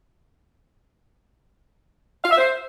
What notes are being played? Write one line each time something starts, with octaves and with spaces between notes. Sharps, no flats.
F5
E5
C5